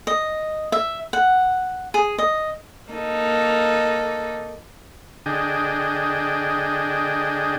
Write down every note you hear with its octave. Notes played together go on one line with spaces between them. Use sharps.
D#5
E5
F#5
G#4
D#5
A#3 D#4 A4
D3 D4 G#4 D#5 G5